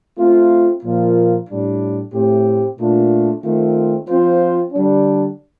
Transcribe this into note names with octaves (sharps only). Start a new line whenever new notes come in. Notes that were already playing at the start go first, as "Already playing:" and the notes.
A3 C4 F4
A#2 F3 A#3 F4
A2 G3 D4
A2 A3 C4 G4
A#2 A3 D4 F4
D#3 A3 C4 F4
F3 C4 F4 C5
D3 G3 D4